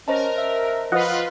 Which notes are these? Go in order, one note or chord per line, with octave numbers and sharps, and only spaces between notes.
C#4 A#4 C5 D#5 A5
E5
F3 F4 B4 D#5 F#5